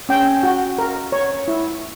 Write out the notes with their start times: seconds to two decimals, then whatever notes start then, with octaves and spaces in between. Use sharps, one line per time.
0.09 C#4 G5
0.43 F#4
0.78 A#4
1.12 C#5
1.48 E4